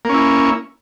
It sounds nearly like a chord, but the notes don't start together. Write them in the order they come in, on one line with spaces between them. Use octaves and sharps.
A#3 C#4 E4